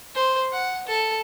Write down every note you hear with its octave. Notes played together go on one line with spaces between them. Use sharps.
C5
F#5
A4